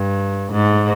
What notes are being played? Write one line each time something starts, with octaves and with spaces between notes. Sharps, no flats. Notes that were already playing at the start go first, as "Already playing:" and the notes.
Already playing: G2
G#2